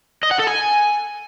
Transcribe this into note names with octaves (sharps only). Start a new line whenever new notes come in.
D#5
F#5
A4
G#5